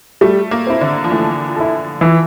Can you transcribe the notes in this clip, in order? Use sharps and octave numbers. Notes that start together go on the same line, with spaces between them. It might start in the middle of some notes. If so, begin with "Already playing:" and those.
G3 A3
A#3
C4 E4
D3
F3
E3 A3
E4 A4
E3 F3